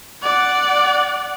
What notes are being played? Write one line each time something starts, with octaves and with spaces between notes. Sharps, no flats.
D5 F#5